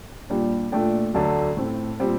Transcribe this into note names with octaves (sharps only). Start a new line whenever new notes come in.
A#2 G3 D4
A#2 A3 D4 G5
D2 D3 F#3 A3 A5
A2 A3 C4
A#2 G3 C4